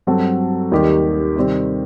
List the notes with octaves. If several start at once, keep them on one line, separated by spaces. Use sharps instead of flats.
G2 F#3 C4 F#4 A4
D#2 D#3 G3 D#4 G4
C3 D#3 G3 C4